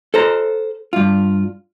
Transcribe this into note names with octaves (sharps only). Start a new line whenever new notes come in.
A4 C5 A#5
G2 F4